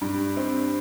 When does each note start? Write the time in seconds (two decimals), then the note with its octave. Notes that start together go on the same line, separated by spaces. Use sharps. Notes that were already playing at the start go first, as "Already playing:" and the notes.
0.01 G2
0.37 C4